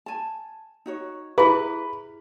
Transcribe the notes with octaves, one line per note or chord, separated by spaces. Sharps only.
G#5 A5
D#4 F#4 C#5
E4 G4 G#4 B4 E5 B5